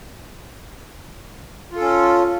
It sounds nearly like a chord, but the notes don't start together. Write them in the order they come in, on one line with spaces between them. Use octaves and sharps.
F4 A4 C#4